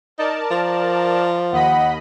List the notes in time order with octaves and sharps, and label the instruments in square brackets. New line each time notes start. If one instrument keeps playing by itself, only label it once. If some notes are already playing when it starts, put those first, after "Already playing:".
[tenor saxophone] D#4 [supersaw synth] A#4 D5 A5
[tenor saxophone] F3
[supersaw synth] D#2 D#5 B5 [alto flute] F#5